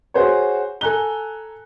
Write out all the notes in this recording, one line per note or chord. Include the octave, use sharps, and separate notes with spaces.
F#4 G#4 C5 C#5
A4 G#5 A#5 F#6 G7